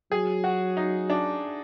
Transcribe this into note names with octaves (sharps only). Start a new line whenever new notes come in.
F#3 G#4
F#4
D#4
D4